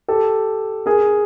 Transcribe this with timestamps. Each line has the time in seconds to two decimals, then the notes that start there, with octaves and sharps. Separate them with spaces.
0.08 G4 A4
0.86 G#4 A#4